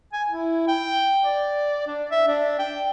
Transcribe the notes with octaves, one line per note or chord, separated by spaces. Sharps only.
G#5
E4
G5
D5
D4
E5
D4
G5